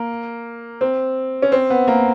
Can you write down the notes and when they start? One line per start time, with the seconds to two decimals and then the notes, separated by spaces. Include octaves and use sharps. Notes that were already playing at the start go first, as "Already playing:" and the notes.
Already playing: A#3
0.81 C4
1.42 C#4
1.52 C4
1.70 B3
1.88 A#3